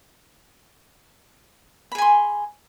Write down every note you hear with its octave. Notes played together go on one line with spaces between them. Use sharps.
G#4 G#5 B5 C6